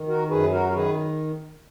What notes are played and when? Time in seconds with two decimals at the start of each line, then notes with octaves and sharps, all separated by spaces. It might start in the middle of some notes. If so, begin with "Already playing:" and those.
Already playing: D#3
0.08 F#4 A#4
0.30 F#2 G#4 B4
0.52 F#4 A#4
0.69 A#4
0.74 D#3 G#4 B4